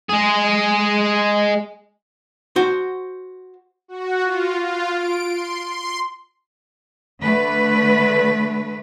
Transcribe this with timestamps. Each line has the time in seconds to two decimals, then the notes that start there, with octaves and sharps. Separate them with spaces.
0.10 G#3 G#4
2.56 F#4 C5
3.88 F#4
4.23 F4
4.64 F4
4.95 D7
5.28 C6
5.68 C6
7.21 D3 A3 B4